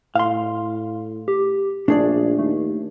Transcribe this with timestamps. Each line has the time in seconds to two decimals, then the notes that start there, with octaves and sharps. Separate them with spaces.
0.15 A2 F5 C6
1.28 G4
1.88 A#1 A3 D4 G#4 D5
2.39 D#2 A3